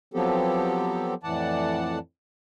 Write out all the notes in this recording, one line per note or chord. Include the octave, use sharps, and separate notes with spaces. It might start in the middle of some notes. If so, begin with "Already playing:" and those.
F3 F#3 B3 C4 G4 A4
F2 A2 E3 D5 F#5 A5